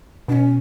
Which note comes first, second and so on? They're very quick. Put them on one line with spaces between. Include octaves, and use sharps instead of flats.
B2 D4 C#4